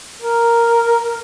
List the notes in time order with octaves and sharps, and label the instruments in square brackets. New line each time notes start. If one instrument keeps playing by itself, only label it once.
[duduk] A#4